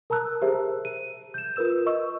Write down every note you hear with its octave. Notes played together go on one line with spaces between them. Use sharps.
A#4 A5 A#5 E6 F#6
G4 G#4 A#4 C5 E5
D#7
G6 E7
F4 A#4 B4 E6 E7
D#5 C#6 E6